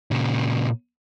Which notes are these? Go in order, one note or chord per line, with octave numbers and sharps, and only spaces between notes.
A#2 C#3